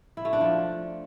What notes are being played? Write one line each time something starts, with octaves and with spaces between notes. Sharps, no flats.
E4
A3
D4
F3